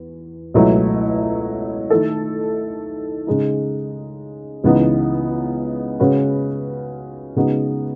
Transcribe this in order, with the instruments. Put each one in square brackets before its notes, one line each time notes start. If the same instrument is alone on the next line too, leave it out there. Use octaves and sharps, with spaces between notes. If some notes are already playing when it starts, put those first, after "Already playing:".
Already playing: [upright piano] E2
C#2 B2 F#3 A3 E4
D#3 A3 E4 A4
C#3 G#3 D#4
C#2 C#3 E3 B3 D#4
C#3 G#3 C#4 F#4 B4
C#3 G#3 B3 D#4 F#4